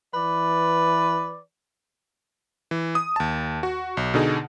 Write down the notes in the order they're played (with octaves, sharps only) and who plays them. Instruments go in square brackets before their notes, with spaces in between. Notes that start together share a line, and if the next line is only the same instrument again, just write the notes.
[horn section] E3 B4 D5
[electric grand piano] E3
D#6
D#2 A5
F#4
B1
B2 D3 D#4 G#4